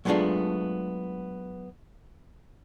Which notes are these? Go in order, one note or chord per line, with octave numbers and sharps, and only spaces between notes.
F#3 G#3 A3 B3 D4 F4